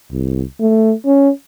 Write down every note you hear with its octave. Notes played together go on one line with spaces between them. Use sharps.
C2
A3
C#4